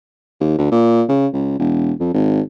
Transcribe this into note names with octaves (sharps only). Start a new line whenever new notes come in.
D#2
D2
A#2
C#3
C#2
E1
F2
G#1